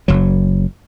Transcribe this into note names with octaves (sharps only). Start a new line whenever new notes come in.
F#1 F#3